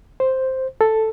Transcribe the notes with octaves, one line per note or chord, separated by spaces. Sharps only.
C5
A4